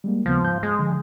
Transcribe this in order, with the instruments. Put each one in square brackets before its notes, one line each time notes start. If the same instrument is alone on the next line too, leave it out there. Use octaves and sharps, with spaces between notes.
[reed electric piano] G3 G#3 A#3
[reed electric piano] D#2 C#3 B3 [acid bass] F3
[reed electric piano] G#2 G6
[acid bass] G#3
[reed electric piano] D3 F3